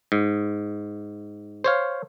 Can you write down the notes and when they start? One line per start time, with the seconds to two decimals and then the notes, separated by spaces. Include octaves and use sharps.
0.12 G#2
1.64 C5 C#5 F5